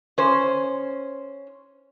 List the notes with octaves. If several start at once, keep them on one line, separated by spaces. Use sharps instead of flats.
C#4 C5